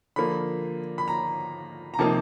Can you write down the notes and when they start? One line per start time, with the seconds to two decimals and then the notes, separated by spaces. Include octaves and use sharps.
0.16 D3 F3 A#3 B5
0.98 B5
1.08 A#5
1.94 A#5
1.99 C3 F3 A#3 D#4 A5